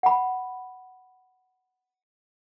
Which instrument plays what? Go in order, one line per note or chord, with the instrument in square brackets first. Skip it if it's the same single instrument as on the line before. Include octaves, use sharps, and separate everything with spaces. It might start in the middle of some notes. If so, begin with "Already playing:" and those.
[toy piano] F#5 B5